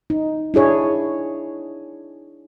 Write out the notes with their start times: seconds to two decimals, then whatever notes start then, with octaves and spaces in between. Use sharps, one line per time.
0.10 D#4
0.54 D4 E4 G#4 C#5